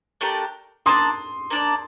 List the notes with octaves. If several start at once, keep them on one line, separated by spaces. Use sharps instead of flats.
A3 D4 G4 A#4
A#3 D4 A4 D5 C6 D#6
A#3 D4 A4 D5